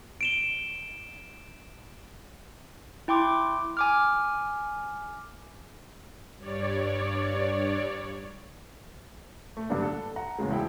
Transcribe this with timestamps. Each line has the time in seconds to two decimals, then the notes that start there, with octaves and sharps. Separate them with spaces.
0.21 D7 E7 G7
3.08 E4 G5 C6 D6
3.77 G#5 D6 F6
6.38 G2 C#5 D5
9.57 A3
9.70 G2 D3 A#3 B3 D4
9.82 A4
10.16 F#5 A#5
10.39 E2 A2 C#3 G#3
10.50 E1 E4 G5